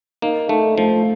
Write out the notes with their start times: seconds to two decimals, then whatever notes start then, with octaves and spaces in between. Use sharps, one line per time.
0.22 A#3 D#4
0.49 A3 D#4
0.78 F3 A3